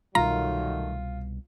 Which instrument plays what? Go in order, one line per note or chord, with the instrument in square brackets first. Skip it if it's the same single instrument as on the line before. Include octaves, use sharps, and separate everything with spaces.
[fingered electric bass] C2 B2 G3 [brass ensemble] D#3 F#3 A3 [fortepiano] F4 [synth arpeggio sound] A#5